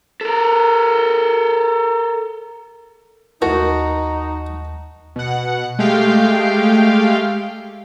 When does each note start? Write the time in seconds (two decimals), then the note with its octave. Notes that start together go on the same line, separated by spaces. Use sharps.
0.21 A4 A#4
3.42 D#2 A3 D#4 F#4 A#4 A5
5.16 B2 F#5
5.79 G#3 A3 G4 F5 G5